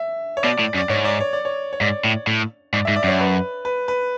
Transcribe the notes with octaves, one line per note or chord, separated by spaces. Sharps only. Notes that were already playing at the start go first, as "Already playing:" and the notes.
Already playing: E5
C#5
B2 D5
A2
F#2
D5
G#2 C#5
D5
C#5
D5
C#5
C#5
G#2 D5
A2
A2
G#2 D5
E5
G#2
D5
F#2 C#5
B4
B4
B4